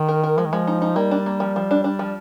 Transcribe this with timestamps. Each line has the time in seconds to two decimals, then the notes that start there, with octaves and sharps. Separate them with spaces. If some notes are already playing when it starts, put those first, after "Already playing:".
Already playing: D#3
0.08 A#4
0.24 A#4
0.37 F3 G#3
0.45 D#3
0.53 F3 G#3
0.67 D#4
0.82 D#4
0.96 G3 A#3
1.11 D4
1.26 A#3
1.40 F3
1.56 F3
1.71 D4
1.84 D4
1.99 F3